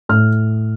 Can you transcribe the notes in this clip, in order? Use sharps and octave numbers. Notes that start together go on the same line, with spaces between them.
A2 F6